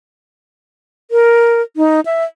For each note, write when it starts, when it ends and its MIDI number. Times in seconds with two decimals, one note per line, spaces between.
1.11 1.62 70
1.77 2.00 63
2.06 2.24 76